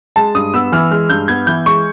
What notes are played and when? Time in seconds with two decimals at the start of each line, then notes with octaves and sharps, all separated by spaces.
0.16 G#3 A5
0.35 G2 D#6
0.54 B3 E6
0.72 E3 F6
0.91 G#3 F6
1.09 G2 G6
1.28 B3 G#6
1.47 E3 G6
1.66 G#3 C#6